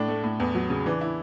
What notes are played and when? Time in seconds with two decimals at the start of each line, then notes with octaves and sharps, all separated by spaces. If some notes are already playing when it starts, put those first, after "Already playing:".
Already playing: A2 D4
0.08 A3
0.24 A2
0.40 E2
0.55 F#3
0.70 C#3
0.86 E3 D4
1.01 E4